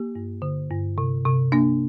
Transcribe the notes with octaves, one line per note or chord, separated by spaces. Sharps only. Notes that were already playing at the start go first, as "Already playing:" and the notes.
Already playing: A#3 G4
G2
D3
G2
C3
C3
A#3 D4